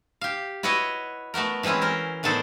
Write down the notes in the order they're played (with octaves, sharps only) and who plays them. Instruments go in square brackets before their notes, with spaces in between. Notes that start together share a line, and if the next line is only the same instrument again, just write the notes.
[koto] G4 F5
E4 F#4 B4 C#5 D#5
A3 B3 F#4 A#4
E3 G#3 C4 C#4 E4
C#4 A#4 C5
A2 D#3 B3 A4 C5 D5